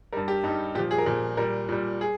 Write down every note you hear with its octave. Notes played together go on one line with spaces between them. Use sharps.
G2 G3 A#4
G4
G2 G3 D#4
A#2 F3 G4
G#4
A#4
A#2 F3 G#4
A#2 G3 A#4
A#2 G3
G#4